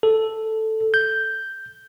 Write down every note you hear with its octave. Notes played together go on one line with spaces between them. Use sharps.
A4
G6